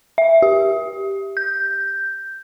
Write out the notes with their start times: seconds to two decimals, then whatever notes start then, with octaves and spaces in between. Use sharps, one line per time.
0.18 E5
0.42 G4
1.37 G6